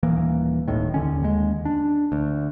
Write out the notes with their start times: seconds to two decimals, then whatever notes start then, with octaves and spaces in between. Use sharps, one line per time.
0.03 D#1 E3 A#3
0.68 D1 A1 A2 D#3
0.94 D#2 D3 C#4
1.23 D#2 G#3
1.65 D4
2.12 D2